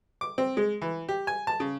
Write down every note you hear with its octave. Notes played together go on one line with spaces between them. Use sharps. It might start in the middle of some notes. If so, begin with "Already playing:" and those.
D6
C4
G#3
E3
G4
G#5
A5
C#3